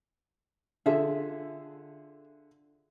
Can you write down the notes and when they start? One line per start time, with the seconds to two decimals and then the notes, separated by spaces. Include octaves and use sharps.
0.86 D3 F4 G#4 A4 E5